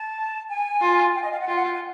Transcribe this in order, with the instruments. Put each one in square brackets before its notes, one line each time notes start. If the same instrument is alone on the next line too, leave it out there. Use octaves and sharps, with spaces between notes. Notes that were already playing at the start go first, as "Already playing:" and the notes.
Already playing: [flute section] A5
G#5
[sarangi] F4
[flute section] G5
D#5
F5
F#5
[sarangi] F4 [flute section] G5
[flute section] F#5
G5
G#5